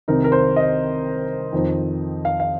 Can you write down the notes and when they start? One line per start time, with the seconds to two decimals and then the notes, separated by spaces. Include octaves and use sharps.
0.08 C2 C3 D#3 C4 D#4 A#4
0.24 A#4
0.32 C5
0.56 D#5
1.53 F2 D#3 C4 D#4
2.25 F5
2.40 F5